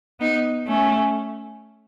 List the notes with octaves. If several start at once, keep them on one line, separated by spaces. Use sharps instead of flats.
B3 D#4
A3 C#4